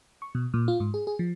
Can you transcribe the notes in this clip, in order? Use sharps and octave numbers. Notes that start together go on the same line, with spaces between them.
C#6
B2
A#2
F4
G#2
G#4
G#4
F3